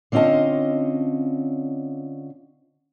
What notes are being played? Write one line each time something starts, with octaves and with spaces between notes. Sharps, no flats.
D3 C4 C#4 F4 D#5 A5